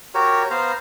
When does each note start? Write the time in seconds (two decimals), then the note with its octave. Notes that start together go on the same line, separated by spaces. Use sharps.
0.15 F#4 G4 A#4 C#5
0.51 B3 C5 F5 A#5